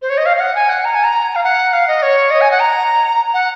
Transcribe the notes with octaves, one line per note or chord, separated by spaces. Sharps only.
C5
C#5
D#5
F5
F5
F#5
G#5
F#5
A#5
G#5
A#5
F5
F#5
F5
D#5
C#5
D#5
G#5
F#5
A#5
F#5